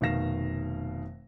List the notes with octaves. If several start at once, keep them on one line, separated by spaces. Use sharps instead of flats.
F1 B2 D#3 F5 A#6 E7